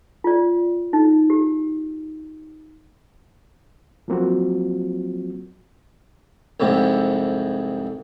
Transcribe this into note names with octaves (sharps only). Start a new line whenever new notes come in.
F4 D5
D#4
G4
F3 F#3 A#3 C4 F4 F#4
C2 F2 G#2 C3